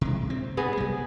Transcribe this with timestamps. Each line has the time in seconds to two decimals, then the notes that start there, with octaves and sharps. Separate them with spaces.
0.01 C3 G#3
0.30 C4
0.57 G2 B3 G#4
0.77 C2 G3